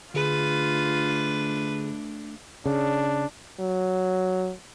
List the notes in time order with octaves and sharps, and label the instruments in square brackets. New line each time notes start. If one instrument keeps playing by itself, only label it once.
[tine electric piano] D3 G#4 [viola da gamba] A3 D4 [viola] F4 [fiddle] B4
[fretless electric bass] C#3 [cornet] D4
[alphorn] F#3